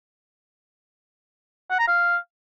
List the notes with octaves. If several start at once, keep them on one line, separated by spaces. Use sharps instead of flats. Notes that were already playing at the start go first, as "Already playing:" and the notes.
F#5
A#5
F5